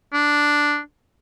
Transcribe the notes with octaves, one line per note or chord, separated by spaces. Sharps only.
D4